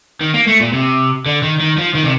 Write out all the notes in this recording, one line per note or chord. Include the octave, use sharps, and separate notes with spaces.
D#3
A#3
A3
A#2
C3
D3
D#3
D#3
F3
D#3
C3